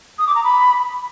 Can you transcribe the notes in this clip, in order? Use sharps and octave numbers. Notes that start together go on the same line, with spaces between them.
D#6
D6
A#5
B5